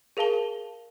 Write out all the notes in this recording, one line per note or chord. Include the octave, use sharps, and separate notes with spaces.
G#4 A#4 F5 A5 G7